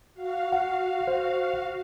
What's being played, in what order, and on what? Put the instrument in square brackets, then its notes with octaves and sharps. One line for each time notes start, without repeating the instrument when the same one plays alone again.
[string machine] F#4 F5
[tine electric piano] F#5
C5